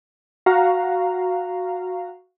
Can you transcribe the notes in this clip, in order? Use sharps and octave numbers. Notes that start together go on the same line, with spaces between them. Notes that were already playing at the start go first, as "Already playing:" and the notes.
F#4 F5 A#5